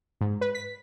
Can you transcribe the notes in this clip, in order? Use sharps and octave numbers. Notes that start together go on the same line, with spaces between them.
G#2
B4
B6